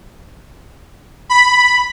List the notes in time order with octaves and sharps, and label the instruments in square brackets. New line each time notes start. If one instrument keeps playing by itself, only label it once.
[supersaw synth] B5